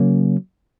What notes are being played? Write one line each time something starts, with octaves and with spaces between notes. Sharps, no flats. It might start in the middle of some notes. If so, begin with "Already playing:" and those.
Already playing: C#3 F#3 A#3 C#4